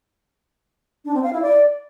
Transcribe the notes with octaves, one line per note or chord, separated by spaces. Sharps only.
D4
C4
F5
E4
D5